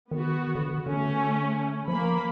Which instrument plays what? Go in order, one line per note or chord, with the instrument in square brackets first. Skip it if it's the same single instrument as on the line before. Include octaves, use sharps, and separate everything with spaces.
[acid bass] D#3 [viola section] B3 F#4
[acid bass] D3
[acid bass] D3 [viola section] A3 C#4
[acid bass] F3 [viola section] A#3 B5